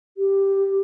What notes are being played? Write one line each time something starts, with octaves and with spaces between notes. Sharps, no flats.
G4